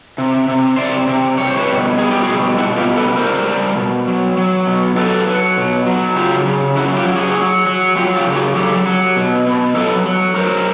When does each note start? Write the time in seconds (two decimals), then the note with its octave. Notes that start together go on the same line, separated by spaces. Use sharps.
0.18 C3
0.48 C3
0.77 C3 C5 D5
1.07 C3
1.38 G3 C#5
1.47 C5
1.57 B4 C#5
1.67 B2
1.98 G3 G#4
2.11 G4
2.23 B2 F#4 G#4
2.57 B2 E4 F#4
2.77 F4 G4
2.88 G3
2.97 A4 B4
3.17 G3 A#4 C5
3.47 G3
3.77 B2
4.07 F#3
4.38 F#3
4.67 B2
4.97 F#3 A4 B4
5.27 F#3
5.57 B2
5.86 F#3
6.16 C#3 F4 G4
6.47 C#3
6.76 F#3 E4 F#4
6.97 F4 G4
7.06 F#3
7.16 F#4 G#4
7.37 F#3
7.67 F#3
7.96 F#3 F4 G4
8.16 F4 G4
8.26 C#3
8.36 F#4 G#4
8.56 F#3 G4 A4
8.86 F#3
9.17 B2
9.47 B2
9.76 F#3 A4 B4
10.06 F#3
10.35 F#3 A#4 C5